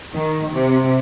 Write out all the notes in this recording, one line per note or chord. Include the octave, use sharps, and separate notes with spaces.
D#3
C3